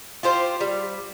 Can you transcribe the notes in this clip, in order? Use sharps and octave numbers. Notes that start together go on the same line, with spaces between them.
F4 G4 C5 F5
G3